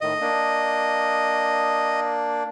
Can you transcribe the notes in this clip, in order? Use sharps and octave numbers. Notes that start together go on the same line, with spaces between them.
A2 D#3 D#5
A#3 D4